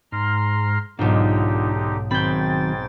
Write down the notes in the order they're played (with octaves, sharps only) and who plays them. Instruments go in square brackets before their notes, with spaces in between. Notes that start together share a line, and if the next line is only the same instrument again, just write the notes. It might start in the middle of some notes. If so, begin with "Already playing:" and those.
[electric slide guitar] G#2 [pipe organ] A#5 C6 F6
[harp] B1 G#2 [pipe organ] D3 D#4 G4 [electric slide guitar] D4 F4
[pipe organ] G#2 G5 A6 [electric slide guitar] D#3 F#3 C4 [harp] B5 G6